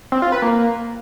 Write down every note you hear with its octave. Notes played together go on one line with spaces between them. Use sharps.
C4
F4
B4
A#3